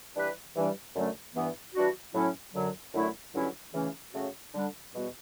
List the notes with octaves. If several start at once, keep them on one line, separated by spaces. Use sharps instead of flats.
E3 G3 D4 G4 B4
G2 E3 G3 D4
F#2 D3 F#3 A3 C#4
G2 E3 B3
E3 G3 D4 F#4
A2 F#3 C#4 E4
F#2 D3 F#3
F#2 D3 F#3 A3 E4
G2 D3 F#3 C#4 E4
C#3 E3 A3 C#4
C#3 F#3 A3 C#4 F#4
D3 G3 D4
E2 B2 G3 B3 F#4